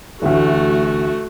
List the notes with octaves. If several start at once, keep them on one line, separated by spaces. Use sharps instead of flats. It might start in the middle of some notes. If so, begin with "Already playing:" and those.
A1 D2 A3 F#4